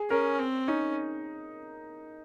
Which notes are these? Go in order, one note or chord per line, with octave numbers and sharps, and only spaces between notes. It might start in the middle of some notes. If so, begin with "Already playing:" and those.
Already playing: G#4
C#4 A#4
C4
C#4 D#4